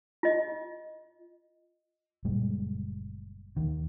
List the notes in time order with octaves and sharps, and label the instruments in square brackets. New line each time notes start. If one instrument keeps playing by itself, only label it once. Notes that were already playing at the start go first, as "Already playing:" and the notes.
[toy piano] F4 D#5
[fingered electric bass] F#1 A#2 G3 G#3
D#2 D#3